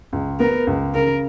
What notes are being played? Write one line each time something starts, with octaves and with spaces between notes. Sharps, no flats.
C#2
B3 A#4
C#2
C#3 A#4